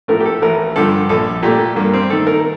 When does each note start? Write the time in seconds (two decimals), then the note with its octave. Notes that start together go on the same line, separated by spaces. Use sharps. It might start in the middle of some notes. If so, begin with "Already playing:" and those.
0.08 A2 F3 A3 A#4
0.20 G4
0.25 A4
0.42 A1 A#4
0.76 G2 D3 F3 A4
1.09 A#1 A4
1.42 A#2 A3 G4
1.76 G2 A#3
1.93 C4
2.10 D#3 A3 A4
2.27 A#4